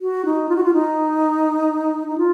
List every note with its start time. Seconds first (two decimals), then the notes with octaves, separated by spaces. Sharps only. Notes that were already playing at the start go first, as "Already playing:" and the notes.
0.01 F#4
0.25 D#4
0.49 F4
0.56 F#4
0.64 F4
0.73 D#4
2.08 D#4
2.18 F4